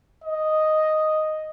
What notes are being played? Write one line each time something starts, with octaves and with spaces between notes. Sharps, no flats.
D#5